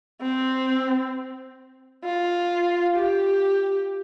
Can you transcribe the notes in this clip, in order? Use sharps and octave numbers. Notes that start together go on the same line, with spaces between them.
C4
F4
G4